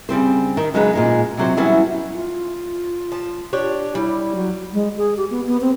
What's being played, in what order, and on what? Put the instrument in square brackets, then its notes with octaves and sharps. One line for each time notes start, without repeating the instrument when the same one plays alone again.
[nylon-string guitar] C#3 G3 C4 C5
D#3
C#3 F#3 G#3 D#4 B4
A#2 G#3 D#4
C3 F#3 C5
E3 F#3 G3 B3 C#4 E4
[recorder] F4
[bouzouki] F3 A5
D4 G4 C#5
[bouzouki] G3 [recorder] E4
[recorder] F#3
[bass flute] G#3
G#4
G4
B3
B3
C4